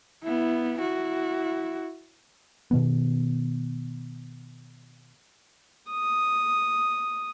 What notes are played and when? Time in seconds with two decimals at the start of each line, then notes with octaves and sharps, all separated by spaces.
0.23 B3 E4
0.79 E4 F#4
2.71 B2 D#3 B3
5.91 D#6